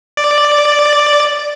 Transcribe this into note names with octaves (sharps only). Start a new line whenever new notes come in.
D5